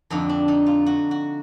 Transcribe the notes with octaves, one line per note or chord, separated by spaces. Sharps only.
F2 D3 D#4
D4
D#4
F4
F#4
F#4